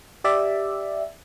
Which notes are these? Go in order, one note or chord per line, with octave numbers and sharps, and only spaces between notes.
G4 D5 E5